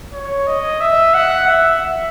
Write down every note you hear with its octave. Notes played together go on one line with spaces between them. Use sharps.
C#5
D#5
E5
F#5
E5